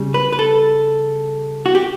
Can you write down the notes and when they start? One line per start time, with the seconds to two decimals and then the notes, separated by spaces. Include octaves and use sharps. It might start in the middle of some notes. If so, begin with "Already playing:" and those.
Already playing: C#3 G3
0.14 B4
0.33 B4
0.39 A4
1.66 F#4
1.75 G4